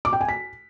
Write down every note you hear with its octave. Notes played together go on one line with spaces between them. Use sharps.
D6
G5
G#5
B6